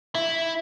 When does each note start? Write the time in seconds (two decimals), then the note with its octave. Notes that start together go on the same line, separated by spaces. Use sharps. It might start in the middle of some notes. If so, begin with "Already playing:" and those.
0.15 E4